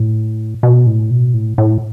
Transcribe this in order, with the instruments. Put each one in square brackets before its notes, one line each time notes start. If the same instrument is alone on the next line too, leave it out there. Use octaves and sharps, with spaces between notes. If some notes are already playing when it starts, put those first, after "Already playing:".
Already playing: [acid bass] A2
B2
A2
B2
A2
A2